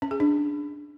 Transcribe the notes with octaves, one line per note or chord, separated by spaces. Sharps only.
C#4
G#4
D4